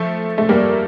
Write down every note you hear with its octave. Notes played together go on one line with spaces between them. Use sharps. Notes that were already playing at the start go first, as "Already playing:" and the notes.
Already playing: F3 A3
A3
G3 A#3